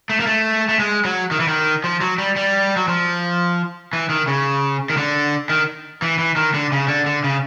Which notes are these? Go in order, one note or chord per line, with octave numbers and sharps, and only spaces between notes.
A3
A#3
A3
A3
G#3
F#3
D#3
E3
D#3
F3
F#3
G3
G3
F#3
F3
E3
D#3
C#3
D#3
D3
D#3
E3
E3
D#3
D3
C#3
D3
D3
C#3